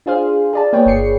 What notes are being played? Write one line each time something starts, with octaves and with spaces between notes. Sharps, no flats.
D4 F4 G#4 C5 F5
G#4 D5 A5
A#3 G#4 B4 C#5 G5
G1 G#4 C7 C#7